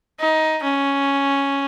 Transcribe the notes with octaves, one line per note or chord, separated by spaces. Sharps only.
D#4
C#4